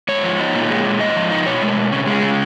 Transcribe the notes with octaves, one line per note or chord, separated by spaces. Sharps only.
G#2 C#5
F3
D#4
A#2
G#3
A#2
G#2 D#5
F3
D#4
B2 C#5
G#3
B2
C#3
G#3
C#3